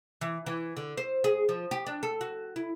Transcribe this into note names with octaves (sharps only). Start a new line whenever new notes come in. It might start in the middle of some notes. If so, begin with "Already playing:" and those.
E3
E3
D3
C5
G#4
F3
G4
D4
A4
F#4
E4